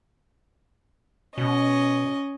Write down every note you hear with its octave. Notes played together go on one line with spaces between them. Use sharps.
B2 C#4 D#5